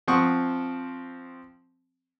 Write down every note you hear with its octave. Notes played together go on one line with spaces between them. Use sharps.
F3 C4 F#5 C#6 D#6